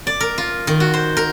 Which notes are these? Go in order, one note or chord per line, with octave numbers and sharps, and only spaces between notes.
D5
A#4
F4
D#3
F#4
C5
A#4